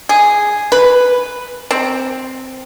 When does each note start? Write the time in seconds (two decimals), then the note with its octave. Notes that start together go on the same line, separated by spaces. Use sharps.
0.09 G#4
0.72 B4
1.71 C4